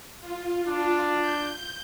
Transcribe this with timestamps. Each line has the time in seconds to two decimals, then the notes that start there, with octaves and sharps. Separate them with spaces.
0.21 F4
0.68 D4
1.21 G6